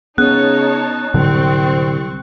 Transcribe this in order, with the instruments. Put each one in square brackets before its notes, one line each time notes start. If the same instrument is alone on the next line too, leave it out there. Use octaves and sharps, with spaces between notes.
[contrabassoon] C#3 [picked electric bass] B3 [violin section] D#4 C#5 A5 [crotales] F#6
[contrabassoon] C2 [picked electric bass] A2 D3 F#3 [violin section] C4 C#6